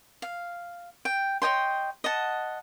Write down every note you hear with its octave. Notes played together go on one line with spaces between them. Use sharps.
F5
G5
C#5 D#5 G5 C6
D#5 F#5 A5